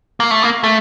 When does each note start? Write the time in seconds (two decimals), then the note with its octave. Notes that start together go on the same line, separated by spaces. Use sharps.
0.20 A#3
0.31 A3
0.43 A#3
0.64 A3